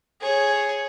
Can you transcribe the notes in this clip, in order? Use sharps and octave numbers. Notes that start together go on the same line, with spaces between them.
G#4 C#5